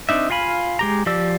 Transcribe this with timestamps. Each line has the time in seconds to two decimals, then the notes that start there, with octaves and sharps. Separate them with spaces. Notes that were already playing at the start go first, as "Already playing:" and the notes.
0.09 C4 D4 D#4 E5
0.30 F4 F5 G#5 B5
0.79 G#3 G4 A#5
1.06 F3 G4 D5 E6